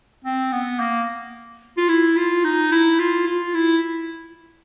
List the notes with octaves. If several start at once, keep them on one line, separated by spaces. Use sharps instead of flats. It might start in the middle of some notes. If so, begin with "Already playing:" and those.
C4
B3
A#3
F4
E4
F4
D#4
E4
F4
F4
E4